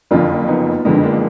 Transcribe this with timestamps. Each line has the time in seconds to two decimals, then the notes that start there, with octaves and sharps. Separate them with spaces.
0.11 F#1 F2 D3 D4 F4
0.48 B3 D#4
0.85 F#1 F2 D3 G#3 B3
1.03 A#3 D4